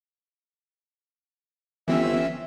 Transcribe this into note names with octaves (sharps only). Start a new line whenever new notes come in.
G1 E3 C4 C#4 E5